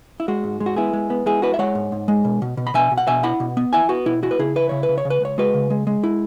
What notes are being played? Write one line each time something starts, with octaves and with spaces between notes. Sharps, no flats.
E4
G#3 F#4
G#2
G#3
F#4
B3 E4 G#4
G#3
B3
G#3 E4 G#4
E4 F#4 B4
E5
G#3 C#5 F#5
G#2
G#2
G#3
B2
B2
B2
B5
B2 E5 G#5
B2
F#5
B2 E5 G#5
E4 F#5 B5
B2
B3
E4 E5 G#5
B3 F#4
B2 E4
E4 F#4
B4
C#3 E4 G#4
E4 B4
C#3 C#5
B4
C#3
C#5
C#3
B4
C#2 C#5
G#3 F#4 B4
C#3
G#3
G#3
E4